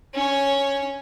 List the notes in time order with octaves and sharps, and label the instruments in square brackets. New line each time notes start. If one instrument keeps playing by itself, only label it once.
[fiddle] C#4 C#5